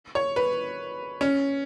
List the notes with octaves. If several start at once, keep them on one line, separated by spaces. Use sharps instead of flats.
C#5
B4
C#4